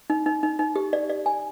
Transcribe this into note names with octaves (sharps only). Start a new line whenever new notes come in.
D#4
D#4
D#4
D#4
G4
D5
D5
G#5